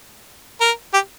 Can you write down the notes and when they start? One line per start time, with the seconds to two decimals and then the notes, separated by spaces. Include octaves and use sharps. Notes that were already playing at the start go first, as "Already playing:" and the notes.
0.61 A#4
0.94 G4